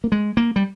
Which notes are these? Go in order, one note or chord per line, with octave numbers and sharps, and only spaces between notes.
A#3
G#3
A#3
G3